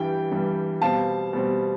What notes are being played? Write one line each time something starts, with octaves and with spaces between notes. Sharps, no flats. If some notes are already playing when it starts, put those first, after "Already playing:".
Already playing: G2 E3 G3 G5
G2 E3 G3
B2 G3 C4 F5 A5
B2 G3 C4